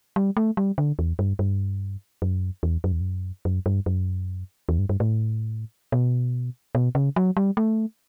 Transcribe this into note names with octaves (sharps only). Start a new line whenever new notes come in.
G3
A3
G3
D3
E2
G2
G2
F#2
E2
F#2
E2
F#2
F#2
G2
F#2
E2
G2
G2
A2
B2
B2
C#3
F#3
G3
A3